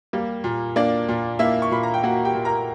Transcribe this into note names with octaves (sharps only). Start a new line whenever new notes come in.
G3 A#3 G4
A#2
A#3 D4 D5
A#2
A#3 E4 E5
C#6
A#2 B5
A#5
G5
A#3 F#4 F#5
G4 G5
A#2
A#4 A#5